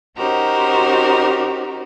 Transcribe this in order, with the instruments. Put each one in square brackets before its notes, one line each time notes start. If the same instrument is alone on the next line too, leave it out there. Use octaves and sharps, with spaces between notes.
[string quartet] C#4 D#4 F#4 G4 A#4 C5